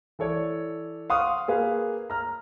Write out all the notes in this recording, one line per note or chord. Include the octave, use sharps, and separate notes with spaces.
E3 A4 C#5 D5
F5 F#5 C6 C#6 D#6 F6
A#3 G#4 B4 F5
A#5 F6